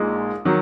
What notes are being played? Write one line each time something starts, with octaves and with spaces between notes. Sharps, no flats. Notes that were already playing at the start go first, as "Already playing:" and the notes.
Already playing: A#1 A#2 G#3 D#4
D#3 F#3